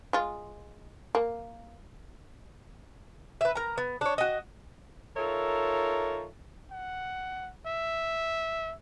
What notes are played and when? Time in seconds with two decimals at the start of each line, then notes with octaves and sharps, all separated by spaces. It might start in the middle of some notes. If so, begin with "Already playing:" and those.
0.13 G#3 F4
1.15 A#3
3.41 B4 E5
3.55 A#4 A#5
3.78 B3
4.01 D4 C#5
4.18 F#4 D#5
5.17 D#4 F4 A4 A#4 C#5 E5
6.71 F#5
7.66 E5